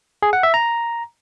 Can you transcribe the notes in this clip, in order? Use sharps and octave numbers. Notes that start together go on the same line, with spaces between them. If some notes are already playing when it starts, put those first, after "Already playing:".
G#4
F#5
E5
A#5